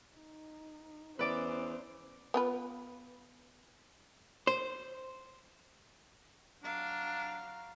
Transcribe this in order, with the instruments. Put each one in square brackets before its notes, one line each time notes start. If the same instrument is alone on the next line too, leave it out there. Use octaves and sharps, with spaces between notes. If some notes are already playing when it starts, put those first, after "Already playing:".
[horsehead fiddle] D#4
[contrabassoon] E2 [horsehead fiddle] C#4 C5 [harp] B4 D5 D6
[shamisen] B3 F4 B4
[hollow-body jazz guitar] C5
[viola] F#3 F5 [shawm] D4 [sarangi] A#5